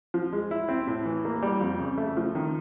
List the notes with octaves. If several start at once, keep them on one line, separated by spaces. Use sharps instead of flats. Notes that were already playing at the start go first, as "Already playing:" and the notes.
F3
G#3
E4
C4
A2
E3
A#3
G3
F2
C#3
A3
F3
D#3